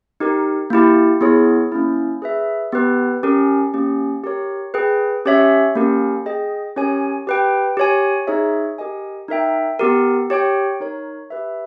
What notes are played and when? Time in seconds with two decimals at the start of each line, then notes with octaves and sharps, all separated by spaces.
0.20 D#4 G4 A#4
0.70 A#3 E4 G4
1.21 B3 E4 G#4 C#5
1.72 A#3 C#4 E4
2.22 G#4 B4 E5
2.72 B3 G4 B4
3.23 C#4 G4 A#4
3.74 A#3 C#4 G4
4.24 G4 A#4 C#5
4.74 G#4 B4 G5
5.25 C#4 G4 C#5 E5
5.75 A#3 C#4 G4 A#4
6.26 G#4 D#5 G5
6.76 C#4 G4 A#4 C#5 G#5
7.27 G4 B4 G5
7.77 G4 C#5 G#5
8.27 D#4 G#4 C#5 E5
8.78 G4 A#4 D#5 G#5
9.28 D#4 A#4 E5 G5
9.79 B3 G4 A#4
10.30 G4 C#5 G5
10.80 D#4 A#4 C#5
11.30 G4 B4 E5